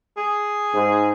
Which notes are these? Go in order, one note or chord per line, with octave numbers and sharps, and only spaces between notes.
G#4
G#2